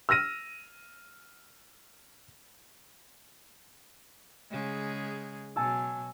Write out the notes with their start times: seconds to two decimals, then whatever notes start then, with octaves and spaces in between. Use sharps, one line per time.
0.09 E6 F6 A#6 D#7
4.51 C#3 G#3 G#4
5.56 B2 F#3 G#5 A5 E6